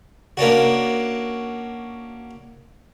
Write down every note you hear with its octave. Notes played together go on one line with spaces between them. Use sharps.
A#3 C#4 D4 F#4